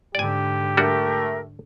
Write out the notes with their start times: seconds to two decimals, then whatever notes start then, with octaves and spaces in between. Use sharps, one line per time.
0.15 G#2 D3 G4 D5 G#5
0.77 G3 A3 D4 F#4 A#4